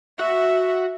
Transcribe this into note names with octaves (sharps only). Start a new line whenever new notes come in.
F#4 E5